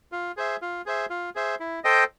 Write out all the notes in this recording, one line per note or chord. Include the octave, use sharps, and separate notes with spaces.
F4
G#4 C5 E5
F4
G#4 C5 E5
F4
G#4 C5 E5
E4
A4 C5 D#5 G5